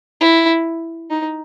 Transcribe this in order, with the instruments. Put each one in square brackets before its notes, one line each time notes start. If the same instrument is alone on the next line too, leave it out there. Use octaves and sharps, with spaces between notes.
[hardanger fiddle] E4
D#4